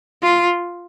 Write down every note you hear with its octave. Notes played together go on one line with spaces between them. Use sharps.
F4